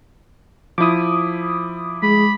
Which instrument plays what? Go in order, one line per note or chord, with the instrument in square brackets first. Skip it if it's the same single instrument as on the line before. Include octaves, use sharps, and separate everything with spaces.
[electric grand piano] F3 E4 [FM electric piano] D6 D#6
[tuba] G#3 [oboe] B5